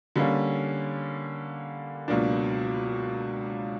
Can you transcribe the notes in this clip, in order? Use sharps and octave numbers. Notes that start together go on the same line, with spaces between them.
D3 G3 A#3 C#4
C#2 B2 F#3 A#3 D4